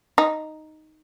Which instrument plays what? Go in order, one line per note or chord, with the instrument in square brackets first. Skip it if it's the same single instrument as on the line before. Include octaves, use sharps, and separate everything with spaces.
[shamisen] D#4